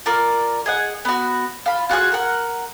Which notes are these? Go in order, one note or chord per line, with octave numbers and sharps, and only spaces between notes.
F4 A#4 D5
G#4 D#5 F#5
B3 F#4
F4 B5
F4 F#4 G#4 F#6
A#4 F#5